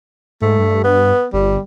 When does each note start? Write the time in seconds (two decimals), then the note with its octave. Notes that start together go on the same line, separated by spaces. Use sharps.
0.42 G#2 A3
0.59 G2
0.84 B3
1.33 G1 G3